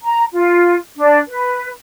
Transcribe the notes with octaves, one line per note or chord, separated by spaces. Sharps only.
A#5
F4
D4
B4